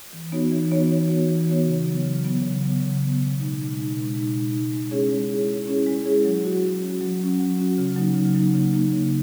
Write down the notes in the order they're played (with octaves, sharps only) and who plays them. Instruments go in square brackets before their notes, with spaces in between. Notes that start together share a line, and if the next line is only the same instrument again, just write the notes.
[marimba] E3
B3 D#4 F#4 C#5
E3
B3 D#4 F#4 C#5
E3
B3 D#4 F#4 C#5
E3
B3 D#4 F#4 C#5
C#3
F#3 B3
C#3
F#3 B3
C#3
F#3 B3
C#3
F#3 B3
B2
G#3 D#4
B2
G#3 D#4
B2
G#3 D#4
B2
G#3 D#4
G#3
C#4 E4 G#4 C#5
G#3
C#4 E4 G#4 C#5
G#3
C#4 E4 G#4 C#5
G#3
C#4 E4 G#4 C#5
F#3
C#4 F#4
F#3
C#4 F#4
F#3
C#4 F#4
F#3
C#4 F#4
C#3
F#3 A#3 D#4
C#3
F#3 A#3 D#4
C#3
F#3 A#3 D#4
C#3